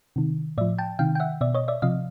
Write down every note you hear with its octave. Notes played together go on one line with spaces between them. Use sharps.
C3 D#3
A2 F3 D5 E5
G5 A5
C3 D#3 F5 G5
G5
E5 F#5
B2 D5 E5
C#5 D#5
D5 E5
C3 F3 D#5 F5